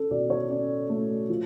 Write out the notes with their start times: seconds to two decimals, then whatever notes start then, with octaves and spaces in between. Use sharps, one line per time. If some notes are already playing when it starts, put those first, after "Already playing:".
Already playing: C#4 A4
0.11 B2 D5
0.30 C#5
0.50 C#4 D5
0.89 A3
1.29 F3